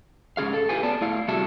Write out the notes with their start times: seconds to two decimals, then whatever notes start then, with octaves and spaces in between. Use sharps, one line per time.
0.37 G#2 C#3 G#4 F5
0.53 A4
0.69 E4 F4 G4 B4 G#5
0.83 B3 D5 A5
1.01 A2 E4 F5
1.28 C3 G3 F#4 G#4 E5 A5